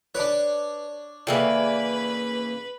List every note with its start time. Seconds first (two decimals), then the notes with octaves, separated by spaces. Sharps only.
0.15 D4 B4 C#5 D5
1.27 C#3 E3 A#3 A4 B4 D5 G5